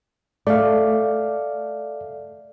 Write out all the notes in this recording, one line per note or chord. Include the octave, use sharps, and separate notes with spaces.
A3 D5 F5